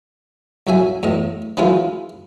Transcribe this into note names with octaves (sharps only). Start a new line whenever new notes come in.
C2 F#3 E5 G#5
E2 A2 D#5
D#3 E3 F#3 G#3 E4 F4